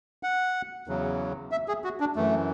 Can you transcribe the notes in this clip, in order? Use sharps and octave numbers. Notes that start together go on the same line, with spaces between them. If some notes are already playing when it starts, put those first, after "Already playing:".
F#5
E2 C#3 F#3
E5
G#4
F#4
D4
F#2 E3 A3